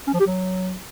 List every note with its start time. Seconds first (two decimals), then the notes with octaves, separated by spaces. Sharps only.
0.07 C#4
0.14 F3
0.20 G4
0.26 F#3